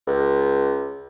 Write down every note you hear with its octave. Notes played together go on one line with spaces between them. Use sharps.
C#2